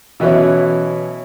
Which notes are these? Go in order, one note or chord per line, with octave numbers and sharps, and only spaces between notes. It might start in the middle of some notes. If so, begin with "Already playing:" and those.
B2 E3 F#3 C#4 E4